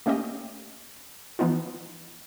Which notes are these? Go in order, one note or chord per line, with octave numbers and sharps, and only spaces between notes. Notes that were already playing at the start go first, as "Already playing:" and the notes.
A3 A#3 C#4 G4 D#5
E3 F3 B3 D#4 F4